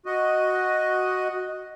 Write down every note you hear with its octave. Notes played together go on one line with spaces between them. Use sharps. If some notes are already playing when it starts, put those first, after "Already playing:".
F#4 D#5